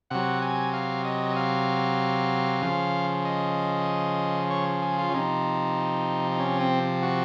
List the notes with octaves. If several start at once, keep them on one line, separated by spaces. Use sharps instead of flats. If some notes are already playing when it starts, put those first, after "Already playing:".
C3 F#3 F#5
G#5
F5
D#5
F5
C#3 F3
D#5
C#5
G#4
F4
C#4
C3 F3 D#4
D#4
C#4
C4
F#4